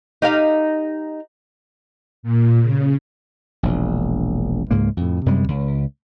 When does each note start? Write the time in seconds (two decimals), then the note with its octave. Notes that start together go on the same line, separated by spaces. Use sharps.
0.22 D#4 G4 F5
2.23 A#2
2.61 C#3
3.63 E1 A#1
4.71 C#2 G#2 G#3 A#3
4.97 F2 A2
5.26 F#2 C3 G3 G#3
5.48 C#2